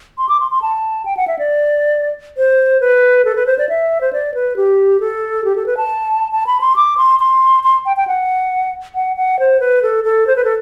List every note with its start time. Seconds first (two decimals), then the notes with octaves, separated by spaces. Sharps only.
0.18 C6
0.29 D6
0.40 C6
0.51 C6
0.62 A5
1.05 G5
1.17 F#5
1.28 E5
1.39 D5
2.37 C5
2.80 B4
3.25 A4
3.36 B4
3.46 C5
3.58 D5
3.69 E5
4.01 C5
4.13 D5
4.34 B4
4.56 G4
5.00 A4
5.44 G4
5.56 A4
5.66 B4
5.77 A5
6.32 A5
6.47 B5
6.61 C6
6.76 D6
6.97 C6
7.20 C6
7.63 C6
7.86 G5
7.97 G5
8.07 F#5
8.95 F#5
9.17 F#5
9.39 C5
9.60 B4
9.82 A4
10.04 A4
10.27 C5
10.36 B4
10.44 A4